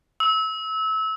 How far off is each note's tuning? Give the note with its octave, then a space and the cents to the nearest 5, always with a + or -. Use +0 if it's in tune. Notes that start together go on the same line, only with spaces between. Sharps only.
E6 -25